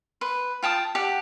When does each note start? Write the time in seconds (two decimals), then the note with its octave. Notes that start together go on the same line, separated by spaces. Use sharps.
0.21 B4 C6
0.63 F4 G5 A5 D#6
0.95 G4 F#5 A5